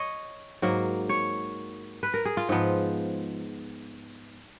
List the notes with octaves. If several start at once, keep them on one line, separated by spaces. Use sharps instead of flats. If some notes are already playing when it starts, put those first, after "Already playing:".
Already playing: C#5 D#5
G#2 F#3 A#3
C#5
B4
A#4
G#4
F4
G#2 F3 B3